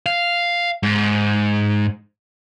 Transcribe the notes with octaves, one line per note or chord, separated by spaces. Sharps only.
F5
G#2